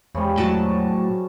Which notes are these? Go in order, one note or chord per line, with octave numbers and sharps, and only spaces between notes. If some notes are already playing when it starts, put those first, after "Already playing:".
E2 C#3 F3 G3 G#3
A2 F#3 F#4 A5